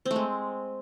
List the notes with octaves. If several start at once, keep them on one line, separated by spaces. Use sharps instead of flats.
C4
A3
G#3